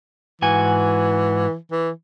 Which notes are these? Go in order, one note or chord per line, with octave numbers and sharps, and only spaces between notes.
G#2 E3 F#4 G#5
E3